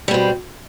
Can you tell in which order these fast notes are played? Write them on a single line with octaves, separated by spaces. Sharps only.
G3 B2 C4